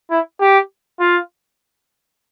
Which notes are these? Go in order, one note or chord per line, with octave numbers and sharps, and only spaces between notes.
E4
G4
F4